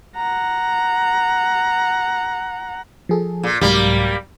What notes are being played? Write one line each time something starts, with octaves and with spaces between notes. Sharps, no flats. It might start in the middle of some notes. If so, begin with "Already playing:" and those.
F#5 A#5
F3 G#4 A4
A#2
C2 G#2 F#3 G3 A#3